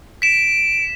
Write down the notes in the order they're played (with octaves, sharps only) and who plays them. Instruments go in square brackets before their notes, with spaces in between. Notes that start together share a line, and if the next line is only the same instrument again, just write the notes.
[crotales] B6 E7 [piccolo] D7